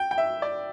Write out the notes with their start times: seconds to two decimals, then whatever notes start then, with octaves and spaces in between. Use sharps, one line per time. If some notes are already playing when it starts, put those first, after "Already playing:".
Already playing: G5
0.11 G5
0.18 E5
0.42 D5